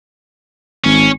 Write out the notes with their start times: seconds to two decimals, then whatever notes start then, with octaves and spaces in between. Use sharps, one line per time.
0.84 G#1 C#4